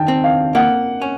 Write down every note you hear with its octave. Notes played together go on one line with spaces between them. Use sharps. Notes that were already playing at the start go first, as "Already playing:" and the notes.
Already playing: D#3 G5 A5
C4
F5
A#3 F#5
C#4